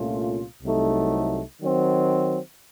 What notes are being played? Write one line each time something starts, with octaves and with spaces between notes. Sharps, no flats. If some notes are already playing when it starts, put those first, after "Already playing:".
Already playing: C2 A#2 A3 C#4 F4
C2 C3 F#3 A3 D#4
D#3 F#3 C4